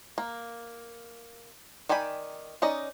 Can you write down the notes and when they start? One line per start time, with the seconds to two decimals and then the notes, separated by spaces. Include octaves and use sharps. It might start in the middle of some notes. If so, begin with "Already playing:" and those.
0.18 A#3
1.89 D#3 D5 G5 G#5 B5
2.62 C#4 D#4 D5 D#5